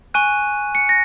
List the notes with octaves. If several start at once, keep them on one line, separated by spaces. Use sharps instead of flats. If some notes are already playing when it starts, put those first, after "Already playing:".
G#5 C#6 F#6 D#7
C#7
A#6